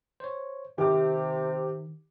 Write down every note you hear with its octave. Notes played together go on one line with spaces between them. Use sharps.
C5 C#5
C3 D#3 G4 D6